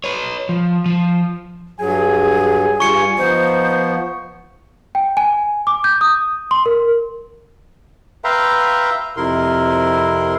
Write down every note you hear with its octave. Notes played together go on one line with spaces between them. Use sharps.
B4 C#5
F3
F3
G2 F#3 G#4 G#5
G2 G3 F4 C#6 C#7
F3 B3 D#4 C5
G5
G#5
D6
G6
D#6
C6
A#4
B4 E5 F5 G5 A#5 C6
F2 C3 E4 A#4 C6